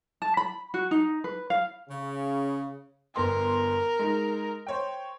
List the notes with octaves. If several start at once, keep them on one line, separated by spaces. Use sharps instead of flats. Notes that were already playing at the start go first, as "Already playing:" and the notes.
A5
B5
F#4
D#4
B4
F5
C#3
G1 B3 A#4 C6
G#3 D#4
C5 C#5 G5